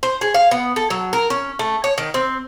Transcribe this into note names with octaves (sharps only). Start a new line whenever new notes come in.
C5
G#4
F5
B3
A4
F#3
A#4
C#4
A3
C#5
D#3
C4